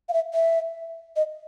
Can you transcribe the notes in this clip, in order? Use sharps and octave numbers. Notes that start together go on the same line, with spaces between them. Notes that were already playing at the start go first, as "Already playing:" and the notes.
F5
E5
E5
D#5